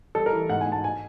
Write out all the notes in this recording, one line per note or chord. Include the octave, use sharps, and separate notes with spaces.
G3 A4
A#4
E3
G#2 F#5
G#5
G#2
A5
G#5